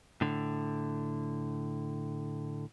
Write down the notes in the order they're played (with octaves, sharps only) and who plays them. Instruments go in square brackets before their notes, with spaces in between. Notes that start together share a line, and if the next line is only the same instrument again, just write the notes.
[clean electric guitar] A2 D3